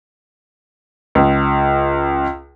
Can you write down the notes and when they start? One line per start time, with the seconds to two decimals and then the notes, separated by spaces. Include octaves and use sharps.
1.15 C#2